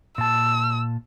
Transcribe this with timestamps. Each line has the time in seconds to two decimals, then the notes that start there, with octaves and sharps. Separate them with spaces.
0.18 A#2 A5 E6